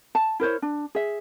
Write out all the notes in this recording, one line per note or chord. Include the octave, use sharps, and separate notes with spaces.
A5
E4 A#4 C5 C#5
D4
G#4 E5